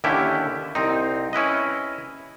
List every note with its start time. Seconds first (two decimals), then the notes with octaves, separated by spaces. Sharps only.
0.04 D#2 D3 C#4 E4 G4 E5
0.75 C2 C4 D#4
1.33 C#4 E4 B4 D#5